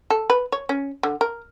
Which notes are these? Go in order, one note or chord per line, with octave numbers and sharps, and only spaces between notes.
A4
B4
C#5
C#4
D3
A#4